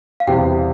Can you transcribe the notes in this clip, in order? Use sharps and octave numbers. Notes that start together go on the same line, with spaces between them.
F5
E2 C3 G3 G5